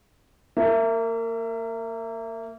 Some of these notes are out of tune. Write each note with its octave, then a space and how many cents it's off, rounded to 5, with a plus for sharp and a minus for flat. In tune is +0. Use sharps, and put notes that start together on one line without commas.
A#3 -25 E5 +20